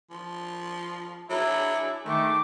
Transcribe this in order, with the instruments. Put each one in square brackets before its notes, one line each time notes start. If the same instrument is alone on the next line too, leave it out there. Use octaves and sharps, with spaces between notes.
[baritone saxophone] F3
[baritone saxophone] F#3 [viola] D4 G#4 [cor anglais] E4
[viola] D#3 D6 [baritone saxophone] G#3 [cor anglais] A3